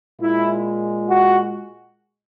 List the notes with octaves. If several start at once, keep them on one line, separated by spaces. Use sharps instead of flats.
A#2 G#3 E4
F#4